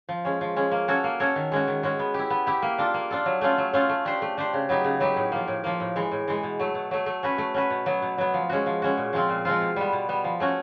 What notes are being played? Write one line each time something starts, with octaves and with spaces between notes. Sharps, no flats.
F3
G#3 C#4
F3
G#3 C#4
A#3
C#4 F#4 A4 C#5
A#3
C#4 F#4 A4 C#5
D#3
G#3 C#4 F#4
D#3
G#3 C#4 F#4
B3
E4 G4
B3
E4 G4
A#3
D4 F4 A4
A#3
D4 F4 A4
F#3
A3 C#4 F4 A4
F#3
A3 C#4 F4 A4
A3
D4 G4 C5
A3
D4 G4 C5
C#3
F#3 B3 D#4 G4
C#3
F#3 B3 D#4 G4
A2
F3 A#3
A2
F3 A#3
A2
E3 G#3
A2
E3 G#3
B2
F#3 A3
B2
F#3 A3
A3
C#4 F#4 B4
A3
C#4 F#4 B4
B2
F#3 B3
B2
F#3 B3
F3
G#3 C#4 F#4
F3
G#3 C#4 F#4
A#2
F3 G#3 C4 F4
A#2
F3 G#3 C4 F4
B2
G3 B3
B2
G3 B3
F3
A3 C#4 F#4